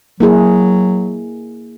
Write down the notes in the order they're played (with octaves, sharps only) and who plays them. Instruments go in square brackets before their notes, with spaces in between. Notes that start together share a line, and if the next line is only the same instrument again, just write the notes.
[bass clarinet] F#3 [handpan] A#3 E4 G#4